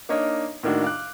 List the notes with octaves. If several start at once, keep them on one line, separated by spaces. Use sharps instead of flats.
A#3 D4 D#4 A#4 C#5 D#5
A2 D#3 A#3 D4 F#4
F5 D6 F#6